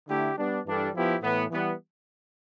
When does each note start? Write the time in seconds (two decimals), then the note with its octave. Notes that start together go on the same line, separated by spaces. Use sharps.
0.09 D3 A3 E4 G4
0.38 G3 B3 D4
0.66 G2 E3 G3 D4 A4
0.95 F3 B3 E4 G4
1.23 A2 E3 B3
1.51 E3 G3 B3